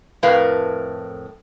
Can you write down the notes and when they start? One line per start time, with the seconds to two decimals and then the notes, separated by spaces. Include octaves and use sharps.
0.23 F2 A2 A#4 B4 F5